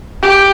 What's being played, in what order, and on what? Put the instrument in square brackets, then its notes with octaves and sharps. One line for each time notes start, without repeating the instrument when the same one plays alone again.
[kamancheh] G4